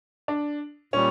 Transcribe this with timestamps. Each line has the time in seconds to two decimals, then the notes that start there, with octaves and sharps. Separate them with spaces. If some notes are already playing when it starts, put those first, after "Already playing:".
0.28 D4
0.93 A#2 G3 C#4